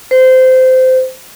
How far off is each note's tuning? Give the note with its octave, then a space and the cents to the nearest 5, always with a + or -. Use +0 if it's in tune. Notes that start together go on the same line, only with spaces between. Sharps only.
C5 -20